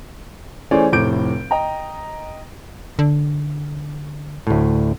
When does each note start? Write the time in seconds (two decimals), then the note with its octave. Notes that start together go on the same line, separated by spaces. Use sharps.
0.71 E3 A3 C#4 G#4 C5 D5
0.92 F1 A2 C3 D6 G6 D7
1.51 D#5 G5 A#5
2.99 D3
4.47 D2 A2